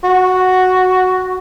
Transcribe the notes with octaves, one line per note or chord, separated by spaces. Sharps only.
F#4